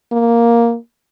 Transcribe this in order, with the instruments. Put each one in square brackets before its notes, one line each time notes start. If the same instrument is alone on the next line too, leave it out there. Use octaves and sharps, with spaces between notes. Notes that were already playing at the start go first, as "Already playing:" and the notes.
[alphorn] A#3